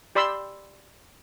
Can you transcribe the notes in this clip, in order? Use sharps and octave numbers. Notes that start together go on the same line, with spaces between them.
G4 D5 B5 C6 E6